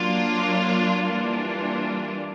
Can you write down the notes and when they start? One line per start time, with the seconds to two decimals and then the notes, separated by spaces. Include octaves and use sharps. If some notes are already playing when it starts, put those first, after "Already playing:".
Already playing: F#3 A#3 D4 F4
1.04 E3 G3 A#3 D4 F4